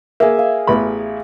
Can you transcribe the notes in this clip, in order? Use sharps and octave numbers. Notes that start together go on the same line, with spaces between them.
A#3 G#4 E5
F5
A1 B3 B5